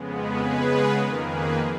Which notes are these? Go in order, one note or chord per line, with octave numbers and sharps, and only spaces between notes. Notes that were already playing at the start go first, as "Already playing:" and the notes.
Already playing: F2 C#3 G#3 B3
G#4 B4
C#3 G#3 B3
F2 D#3 A#3 A#4
G#4 B4